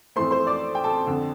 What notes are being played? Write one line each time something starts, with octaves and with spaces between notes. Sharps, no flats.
F2 E3 A3 C5 C6
C5 C6
D5 D6
G5
A4 A5
F2 D3